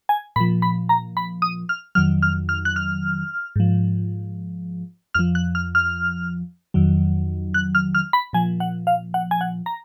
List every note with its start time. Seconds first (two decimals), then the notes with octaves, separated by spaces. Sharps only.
0.09 G#5
0.36 A#2 F3 B5
0.62 B5
0.89 A#5
1.17 B5
1.42 D#6
1.69 F6
1.95 F2 D#3 F#3 F6
2.22 F6
2.49 F6
2.65 F#6
2.76 F6
3.56 G#2 F3
5.14 F2 F3 F6
5.35 F#6
5.55 F6
5.75 F6
6.74 F2 D#3 F#3
7.54 F#6
7.75 F6
7.95 F6
8.13 B5
8.33 A#2 F3 G#5
8.60 F#5
8.87 F5
9.14 F#5
9.31 G#5
9.41 F#5
9.66 A#5